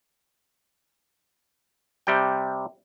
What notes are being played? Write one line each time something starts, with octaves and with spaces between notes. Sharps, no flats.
C3 G3 G5